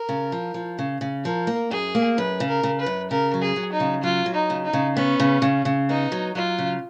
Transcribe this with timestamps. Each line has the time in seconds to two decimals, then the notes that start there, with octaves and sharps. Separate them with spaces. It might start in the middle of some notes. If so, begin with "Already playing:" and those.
Already playing: A#4
0.09 C#3
0.32 F3
0.54 F3
0.79 C#3
1.01 C#3
1.24 F3 A#4
1.47 A#3
1.71 F#2 G#4
1.95 A#3
2.17 F#2 B4
2.40 C#3
2.48 A#4
2.63 C#3
2.80 B4
2.86 F#2
3.10 C#3 A#4
3.34 F#3
3.42 G#4
3.56 F#3
3.72 D#4
3.80 C#3
4.03 F#3 F4
4.26 F#3
4.34 D#4
4.50 C#3
4.65 D#4
4.73 C#3
4.96 B3 C#4
5.20 C#3
5.42 C#3
5.65 C#3
5.89 B3 D#4
6.12 F#3
6.35 F#3 F4
6.58 C#3